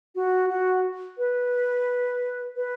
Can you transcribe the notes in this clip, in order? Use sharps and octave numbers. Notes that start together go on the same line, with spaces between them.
F#4
F#4
B4
B4